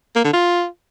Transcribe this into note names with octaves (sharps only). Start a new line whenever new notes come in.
A#3
D3
F4